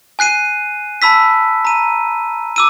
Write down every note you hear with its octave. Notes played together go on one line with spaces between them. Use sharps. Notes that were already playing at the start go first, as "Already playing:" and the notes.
G#5 F#6 C7 D#7
A5 B5 E6 B6
A#5 D#7
D6 E6 D#7